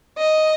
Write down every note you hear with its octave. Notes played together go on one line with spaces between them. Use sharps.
D#5